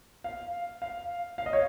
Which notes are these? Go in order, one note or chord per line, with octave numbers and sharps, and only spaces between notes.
F5
F5
F5
D#5
C#5